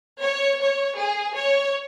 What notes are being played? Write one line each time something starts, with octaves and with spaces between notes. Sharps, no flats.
C#5
C#5
G#4
C#5